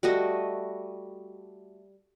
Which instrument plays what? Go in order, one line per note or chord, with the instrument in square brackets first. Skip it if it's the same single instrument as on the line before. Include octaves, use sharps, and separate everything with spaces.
[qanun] G3 A3 F#4 D#5